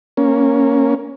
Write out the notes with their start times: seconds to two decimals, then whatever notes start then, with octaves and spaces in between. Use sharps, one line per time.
0.17 A#3 C#4